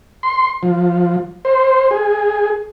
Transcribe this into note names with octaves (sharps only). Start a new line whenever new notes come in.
C6
F3
C5
G#4